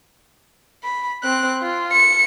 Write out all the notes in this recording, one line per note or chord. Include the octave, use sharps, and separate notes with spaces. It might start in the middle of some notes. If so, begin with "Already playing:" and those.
B5
C4 F#6
F4
C#7